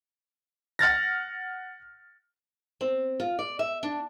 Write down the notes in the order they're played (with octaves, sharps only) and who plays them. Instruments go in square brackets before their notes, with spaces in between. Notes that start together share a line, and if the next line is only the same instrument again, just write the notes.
[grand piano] F#5 F6 A6 A#6
[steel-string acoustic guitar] C4
F4
D5
E5
D4